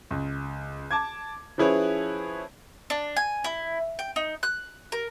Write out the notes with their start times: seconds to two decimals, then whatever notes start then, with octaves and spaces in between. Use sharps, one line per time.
0.11 C#2
0.91 A5 D6 G#6
1.58 F3 C#4 E4 G#4 B4 C#5
2.90 D4
3.16 G#5
3.44 E4
3.99 G5
4.16 D#4
4.43 F#6
4.92 A#4